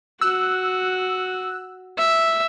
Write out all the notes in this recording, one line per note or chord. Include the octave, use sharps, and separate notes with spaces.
F#4 E6 F#6
E5